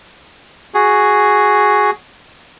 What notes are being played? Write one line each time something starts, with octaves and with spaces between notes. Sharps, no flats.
F#4 G#4